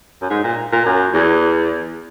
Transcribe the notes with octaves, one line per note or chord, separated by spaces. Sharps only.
F#2
G#2
A#2
A#2
F#2
E2